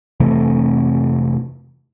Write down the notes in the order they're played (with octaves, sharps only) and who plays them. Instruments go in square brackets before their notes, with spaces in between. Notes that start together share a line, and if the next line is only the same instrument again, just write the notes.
[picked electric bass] F2 C3 E3 A3